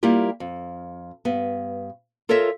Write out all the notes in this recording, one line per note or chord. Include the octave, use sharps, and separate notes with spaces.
G3 A#3 E4 F4 G4
F2
G2 B3
F4 A4 A#4 C#5 D#5 E5